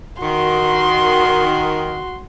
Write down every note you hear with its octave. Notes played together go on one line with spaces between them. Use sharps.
D#3 F#4 C6